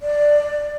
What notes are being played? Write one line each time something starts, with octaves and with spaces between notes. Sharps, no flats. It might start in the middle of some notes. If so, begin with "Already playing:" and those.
D5